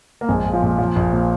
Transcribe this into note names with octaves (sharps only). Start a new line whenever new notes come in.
A#3
A#1 G#3
A#2
F3
A#2
A#2 F3
A#1
A#2